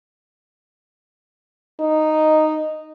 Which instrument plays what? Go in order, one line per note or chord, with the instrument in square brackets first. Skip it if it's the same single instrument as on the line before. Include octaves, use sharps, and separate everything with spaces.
[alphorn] D#4